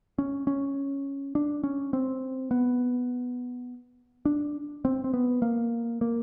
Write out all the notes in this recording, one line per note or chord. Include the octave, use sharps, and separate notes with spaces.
C#4
C#4
D4
C#4
C4
B3
D4
C4
C4
B3
A#3
A#3